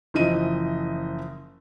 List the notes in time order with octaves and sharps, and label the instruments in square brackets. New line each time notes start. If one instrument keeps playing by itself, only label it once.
[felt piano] F#1 E3 F3 D#5 D#7